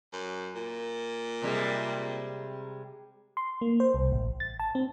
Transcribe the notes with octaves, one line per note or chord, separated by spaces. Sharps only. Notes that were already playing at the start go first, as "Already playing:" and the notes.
F#2
A#2
C3 G3 G#3
C6
A#3
C5
C2
A1
A6
A5
C4